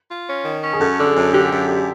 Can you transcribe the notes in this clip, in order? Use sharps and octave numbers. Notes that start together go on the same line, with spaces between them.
F4
C#4
D#3
C#4
G#4
F#2 A4
D3
G#4
F#2
D3 G4
F#2
D3